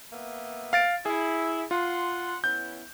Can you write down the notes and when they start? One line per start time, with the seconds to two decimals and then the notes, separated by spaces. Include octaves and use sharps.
0.11 A#3 B3 E5
0.73 F5 A6 D7
1.06 E4 G#4
1.71 F4 F#5 C6
2.44 B3 C#4 E4 G6